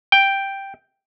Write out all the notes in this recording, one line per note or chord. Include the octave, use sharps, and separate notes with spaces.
G5